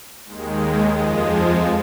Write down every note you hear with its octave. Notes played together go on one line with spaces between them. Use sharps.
D#2 D#3 G#3
A#4
F2 F3 G#3 G#4
G#4